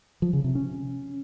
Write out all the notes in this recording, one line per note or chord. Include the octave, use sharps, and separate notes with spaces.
F3
C#3
C3
C#4